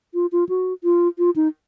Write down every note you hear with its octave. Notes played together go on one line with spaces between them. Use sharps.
F4
F4
F#4
F4
F4
D#4